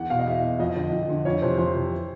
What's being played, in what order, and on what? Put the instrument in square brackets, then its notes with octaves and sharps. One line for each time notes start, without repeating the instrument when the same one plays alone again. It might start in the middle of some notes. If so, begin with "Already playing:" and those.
Already playing: [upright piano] E2 F#5
B2 F5
D#5
E2 E5
B2
F2 D#5
D3 D#5
F2
D3
F2 C#5
C3 E3 C5
F2 C5
C3 E3